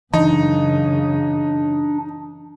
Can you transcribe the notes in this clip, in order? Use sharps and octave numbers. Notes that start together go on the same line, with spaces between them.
F#2 C#3 E3 D4 D#4